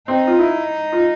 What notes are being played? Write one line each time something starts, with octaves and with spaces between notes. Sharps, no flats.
C4 D#4
F4
E4
F4